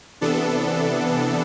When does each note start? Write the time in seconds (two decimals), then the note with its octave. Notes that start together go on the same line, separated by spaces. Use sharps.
0.21 C3 E3 B3 D4 A4